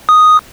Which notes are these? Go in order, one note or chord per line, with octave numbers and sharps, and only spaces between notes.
D#6